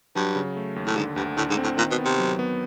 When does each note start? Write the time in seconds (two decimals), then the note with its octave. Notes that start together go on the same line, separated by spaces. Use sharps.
0.16 G2 F#3
0.35 C#3
0.56 A3
0.76 D#2
0.86 A2
0.96 G#2 D3
1.16 D2 G2
1.37 A2 D3
1.50 G#2
1.57 C4
1.63 A2
1.77 A#2 D#3
1.91 B2
1.98 B3
2.05 C3
2.19 F#3
2.39 B3